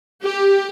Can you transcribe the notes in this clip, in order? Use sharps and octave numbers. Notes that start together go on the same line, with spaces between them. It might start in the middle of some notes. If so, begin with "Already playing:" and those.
G4